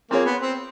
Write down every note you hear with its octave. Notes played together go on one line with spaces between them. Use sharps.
A#3 C4 F4 G#4 C#5
B3
C4